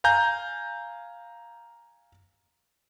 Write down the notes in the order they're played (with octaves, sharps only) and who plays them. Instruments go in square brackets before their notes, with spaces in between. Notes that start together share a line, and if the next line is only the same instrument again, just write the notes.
[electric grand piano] F5 G#5 A#5 G6